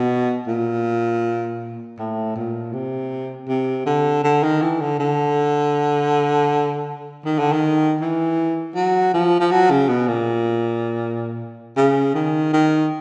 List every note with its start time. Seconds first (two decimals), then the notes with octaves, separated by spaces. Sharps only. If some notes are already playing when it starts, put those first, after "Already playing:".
Already playing: B2
0.48 A#2
1.98 A2
2.36 A#2
2.73 C3
3.49 C3
3.86 D3
4.24 D3
4.43 D#3
4.62 E3
4.80 D3
4.99 D3
7.25 D#3
7.39 D3
7.52 D#3
8.01 E3
8.75 F#3
9.14 F3
9.40 F3
9.51 F#3
9.71 C#3
9.89 B2
10.08 A#2
11.77 C#3
12.15 D#3
12.53 D#3